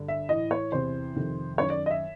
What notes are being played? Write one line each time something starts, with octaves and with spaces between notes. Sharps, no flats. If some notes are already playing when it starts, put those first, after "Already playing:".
Already playing: G2 D3
E5
A2 E3 D#5
C#5
E2 C3 E3 C5
F2 C3 D#3
F#2 D#3 C#5
D5
D#5
E5